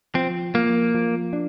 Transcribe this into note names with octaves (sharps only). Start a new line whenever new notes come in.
F3 C4
F3 A#3
F3
D4